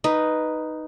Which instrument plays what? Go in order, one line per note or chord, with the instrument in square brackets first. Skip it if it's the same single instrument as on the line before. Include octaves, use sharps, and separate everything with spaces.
[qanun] D#4 B4